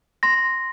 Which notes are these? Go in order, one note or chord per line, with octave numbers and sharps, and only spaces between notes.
C6 A#6